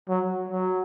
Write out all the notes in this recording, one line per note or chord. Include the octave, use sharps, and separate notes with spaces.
F#3
F#3